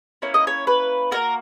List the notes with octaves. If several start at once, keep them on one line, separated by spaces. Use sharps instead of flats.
A#3 C#4 E4 C#5
D#5
C#5
B4
A#3 C#4 F#4 A#4